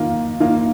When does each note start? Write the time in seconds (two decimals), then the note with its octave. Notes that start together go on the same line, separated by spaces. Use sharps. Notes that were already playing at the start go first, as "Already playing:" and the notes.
Already playing: D#3 A#3 F4
0.40 D#3 A#3 F4